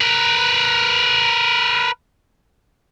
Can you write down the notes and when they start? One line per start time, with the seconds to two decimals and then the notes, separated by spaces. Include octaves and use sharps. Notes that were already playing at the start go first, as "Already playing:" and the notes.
0.01 A#4 B4